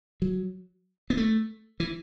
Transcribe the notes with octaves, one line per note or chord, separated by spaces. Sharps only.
F#3
B3
A3
E3